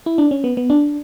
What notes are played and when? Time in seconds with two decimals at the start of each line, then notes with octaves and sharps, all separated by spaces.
0.06 E4
0.18 D4
0.31 C#4
0.44 B3
0.57 B3
0.70 D4